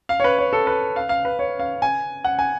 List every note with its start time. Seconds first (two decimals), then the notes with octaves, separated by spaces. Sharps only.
0.09 F5
0.20 C#5
0.24 B4
0.38 C#5
0.53 A4
0.67 B4
0.96 F5
1.09 F5
1.25 B4
1.39 C#5
1.59 F5
1.82 G#5
2.24 F#5
2.39 G#5